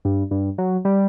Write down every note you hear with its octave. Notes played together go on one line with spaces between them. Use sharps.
G2
G2
F#3
G3